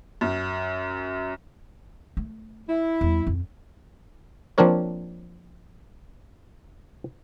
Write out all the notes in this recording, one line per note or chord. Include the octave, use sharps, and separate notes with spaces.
F#2
A3
E4
E2 G3
F2
F3 A#3 C4 D4 A#4 C#5